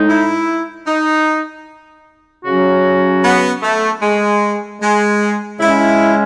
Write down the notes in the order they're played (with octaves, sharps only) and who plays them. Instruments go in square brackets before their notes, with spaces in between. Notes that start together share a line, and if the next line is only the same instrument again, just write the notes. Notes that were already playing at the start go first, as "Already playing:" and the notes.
Already playing: [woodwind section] A2 G#3 D#4
[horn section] E4
D#4
[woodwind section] C#3 F#3 C#4 F#4
[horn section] B3
A3
G#3
G#3
[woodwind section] C#3 G#3 C#4 [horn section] E4